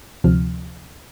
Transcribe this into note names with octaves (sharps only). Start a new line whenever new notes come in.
D2 C3 F3 F6